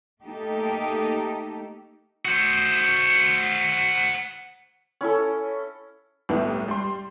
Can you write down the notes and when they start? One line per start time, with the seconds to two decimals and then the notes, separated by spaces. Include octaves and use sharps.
0.25 A3 A#3 D#4 G4 A4
2.25 F#4 C5
5.01 C#4 E4 A4
6.29 C2 A2 G3 B3 E4 G5
6.68 G3 C6